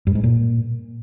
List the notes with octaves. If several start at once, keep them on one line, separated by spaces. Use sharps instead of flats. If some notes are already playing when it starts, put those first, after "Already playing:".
G2
G#2
A#2